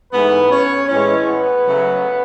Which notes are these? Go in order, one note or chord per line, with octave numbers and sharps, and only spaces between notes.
G#2 E3 A3 B3 B4
C#4 C#5
A2 E3 G#3 C#4 C#5
B3 B4
C#3 F#3 A3